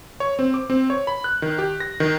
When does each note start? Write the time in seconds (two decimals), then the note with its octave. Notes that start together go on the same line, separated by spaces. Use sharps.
0.20 C#5
0.39 C4
0.54 D6
0.70 C4
0.90 C#5
1.07 B5
1.24 F#6
1.42 D#3
1.58 G4
1.80 A#6
2.00 D#3